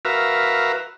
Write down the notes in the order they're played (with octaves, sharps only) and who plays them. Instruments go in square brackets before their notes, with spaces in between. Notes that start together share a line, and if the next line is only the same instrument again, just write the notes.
[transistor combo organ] F#4 A#4 B4 E5 F5